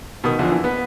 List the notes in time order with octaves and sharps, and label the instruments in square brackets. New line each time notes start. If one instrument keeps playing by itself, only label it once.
[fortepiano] B2 D#3 D#6
E2 D3 F3
E3
B3